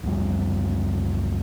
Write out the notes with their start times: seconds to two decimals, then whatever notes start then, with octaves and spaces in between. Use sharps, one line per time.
0.03 C#2 F#2 G3